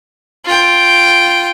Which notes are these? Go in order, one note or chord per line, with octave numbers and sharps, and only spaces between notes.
F4 G5